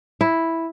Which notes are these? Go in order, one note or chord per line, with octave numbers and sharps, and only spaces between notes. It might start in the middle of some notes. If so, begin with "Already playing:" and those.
E4